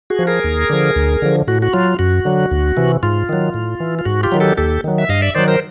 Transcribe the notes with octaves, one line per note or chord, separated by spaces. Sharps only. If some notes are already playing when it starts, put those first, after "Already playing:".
F#4 G#4
F3
G#4 A#4
D#2
D3 F3
D2
D3 F3
A2 F#4
F#4
F#3 F4
F#2 F#4
D3 F#3
D2
C3 E3
G#2 F4
D#3 F#3
A2
E3
F4
G#2 F#4
F4 G4
D#3 F#3
G4 A4
D#2 G4 A4
D#3 F#3
E5
G2 D#5 F5
D5 E5
D#3 F#3 C5 D5
A#4 C5